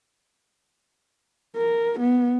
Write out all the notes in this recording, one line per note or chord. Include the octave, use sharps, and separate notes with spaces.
A#4
B3